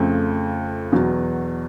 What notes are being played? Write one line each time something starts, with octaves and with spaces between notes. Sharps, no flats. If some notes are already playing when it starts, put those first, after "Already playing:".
Already playing: F2 C#3 F3 A3
E2 B2 F#3 B3